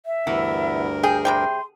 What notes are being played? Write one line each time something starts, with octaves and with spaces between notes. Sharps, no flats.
E5
D2 G2 E3 B3 A#4
G#4 G5
C3 G3 G5 C6